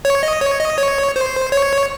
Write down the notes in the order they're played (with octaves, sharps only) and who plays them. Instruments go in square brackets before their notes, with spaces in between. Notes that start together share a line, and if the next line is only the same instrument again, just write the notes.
[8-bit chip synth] C#5
D#5
C#5
D#5
C#5
C5
C#5